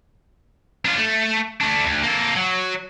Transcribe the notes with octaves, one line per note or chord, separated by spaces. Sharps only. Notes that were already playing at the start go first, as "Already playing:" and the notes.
D4 F4
A3
A3 D4
D2
A#3 A4
F#3